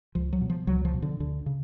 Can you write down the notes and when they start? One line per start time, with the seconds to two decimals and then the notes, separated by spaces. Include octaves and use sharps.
0.15 C#2 F3
0.33 F#3
0.41 B2
0.50 F3
0.67 C#2 F#3
0.85 F3
0.94 B2
1.02 D3
1.20 D2 D3
1.46 C#3